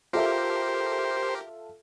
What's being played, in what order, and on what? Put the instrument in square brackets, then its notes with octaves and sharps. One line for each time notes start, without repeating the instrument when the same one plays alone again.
[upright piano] F4 A4 E5 [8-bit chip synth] G4 A#4 [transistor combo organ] C5